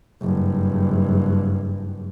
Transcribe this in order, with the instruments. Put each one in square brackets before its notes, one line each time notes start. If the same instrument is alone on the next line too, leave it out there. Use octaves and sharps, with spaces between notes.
[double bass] F#1 G2